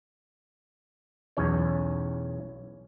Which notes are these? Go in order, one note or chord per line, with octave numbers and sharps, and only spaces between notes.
B1 E2 C#4 C#5